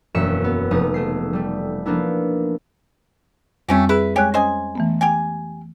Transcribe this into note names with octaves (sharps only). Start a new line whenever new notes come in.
E1 F#2 A#3 E5 C#7 E7
B3
F1 A3 D#4 D#6
A3 G#4 C7
G3 A3
F3 A#3 B3 D4 E4
F2 G3 A3 C4 C#4 G4
E4 G#4 B4
G#3 C#4 G4 C#5 G#5 F#6
C#4 C5 D#5 G#5
E3 A3 B3
G4 G5 G#5